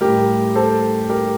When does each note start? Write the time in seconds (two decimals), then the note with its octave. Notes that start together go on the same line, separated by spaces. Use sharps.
0.01 A2 G3 G4 A#4
0.55 A4 C5
1.09 G4 A#4